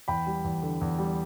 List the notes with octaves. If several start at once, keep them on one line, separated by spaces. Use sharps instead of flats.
E2 G5 B5
G3
E2
D3
E2
G3